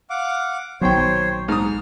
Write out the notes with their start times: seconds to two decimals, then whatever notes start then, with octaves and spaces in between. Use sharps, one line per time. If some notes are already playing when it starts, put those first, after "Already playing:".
0.10 F5 F#5 D6
0.81 A#1 B2 D#3 F#3 C5 C#5 G5
1.48 G#2 D#6 F6